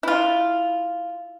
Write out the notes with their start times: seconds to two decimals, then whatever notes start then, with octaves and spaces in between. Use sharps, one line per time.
0.03 E4 F4